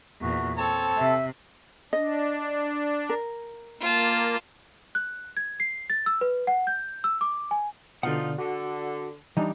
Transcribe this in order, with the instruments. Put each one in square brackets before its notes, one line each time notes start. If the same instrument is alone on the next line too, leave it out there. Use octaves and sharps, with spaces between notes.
[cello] E2 A#2 [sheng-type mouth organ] F#4
[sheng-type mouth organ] C4 A4 [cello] C#5 [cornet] A5
[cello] C3 [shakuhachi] E5
[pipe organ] D4 [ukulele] D#5
[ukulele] A#4
[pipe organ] A#3 [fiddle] F4 A5
[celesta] F#6
G#6
C7
A6
E6
B4
F#5
G6
E6
D6
G#5
[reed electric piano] B2 D3 [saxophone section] F3 D#4 F4 [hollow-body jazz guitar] D5 F#5
[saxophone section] D3 [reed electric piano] F#4
[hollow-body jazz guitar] E3 G3 [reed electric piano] D4 D#4